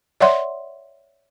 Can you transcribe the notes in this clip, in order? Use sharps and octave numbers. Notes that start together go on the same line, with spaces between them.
C#5 D5 E5 F#5 C6